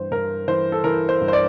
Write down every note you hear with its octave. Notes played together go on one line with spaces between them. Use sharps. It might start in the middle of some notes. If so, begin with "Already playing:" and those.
Already playing: G2 E3 C5
G2 A#4
E3 C5
A4
E3 A#4
C5
G2
C5
D5